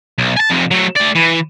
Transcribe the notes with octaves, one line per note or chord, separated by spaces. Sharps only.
B1
G#5 A5
F2 C3
F#3 A3
A3 D5
E3